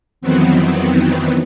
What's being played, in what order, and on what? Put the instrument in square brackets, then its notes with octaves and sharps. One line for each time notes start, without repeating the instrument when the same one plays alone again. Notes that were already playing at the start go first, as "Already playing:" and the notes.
[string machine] F2 D#3 E3 F#3 B3 C4